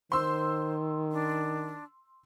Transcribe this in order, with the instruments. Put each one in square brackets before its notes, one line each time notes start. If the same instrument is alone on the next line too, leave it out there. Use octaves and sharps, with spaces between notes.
[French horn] D#3 [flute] C5 [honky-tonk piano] C6 E6
[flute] D4